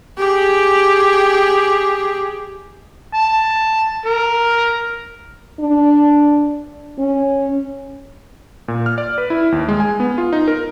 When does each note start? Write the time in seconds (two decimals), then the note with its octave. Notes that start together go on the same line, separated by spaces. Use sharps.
0.19 G4 G#4
3.13 A5
4.05 A#4
5.60 D4
6.99 C#4
8.68 A#2
8.86 F6
8.98 D5
9.18 B4
9.30 E4
9.52 D#2
9.68 G#3
9.80 G#5
10.00 B3
10.18 F4
10.33 D#4
10.48 A#4